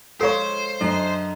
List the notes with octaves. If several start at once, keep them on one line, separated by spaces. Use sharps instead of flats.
C#2 F4 A4 C5 C#5 F5 C#6
F#2 D3 D#5